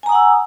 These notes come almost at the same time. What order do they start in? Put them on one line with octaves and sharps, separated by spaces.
G#5 A#5 D#6 F#5 E6